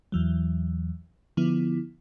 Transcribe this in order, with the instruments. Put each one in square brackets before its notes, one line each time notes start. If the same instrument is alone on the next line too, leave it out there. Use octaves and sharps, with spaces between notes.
[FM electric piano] E2 E3 F#3
D3 F3 B3 E4